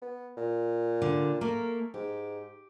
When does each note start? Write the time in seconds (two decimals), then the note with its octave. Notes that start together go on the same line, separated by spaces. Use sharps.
0.02 B3
0.37 A#2
1.02 D3
1.41 A3 A#3 A#4
1.94 G#2 G4